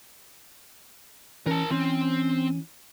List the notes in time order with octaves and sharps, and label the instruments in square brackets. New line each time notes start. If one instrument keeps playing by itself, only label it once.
[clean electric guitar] E3 C#4 [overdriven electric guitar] A#4 A5
[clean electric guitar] E3 C#4 [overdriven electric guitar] C4